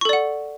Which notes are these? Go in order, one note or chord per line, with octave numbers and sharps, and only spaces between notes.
A4 D5 F#5 C#6